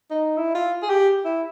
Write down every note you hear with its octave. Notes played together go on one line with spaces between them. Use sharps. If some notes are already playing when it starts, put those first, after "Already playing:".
D#4
E4
F4
G#4
G4
E4